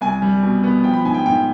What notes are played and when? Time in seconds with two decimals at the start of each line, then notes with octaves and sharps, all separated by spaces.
0.01 C2 G#5
0.22 G3
0.43 B2
0.64 B3
0.84 F3 G5
0.94 B5
1.05 G#2 G#5
1.14 G5
1.26 G#2 G5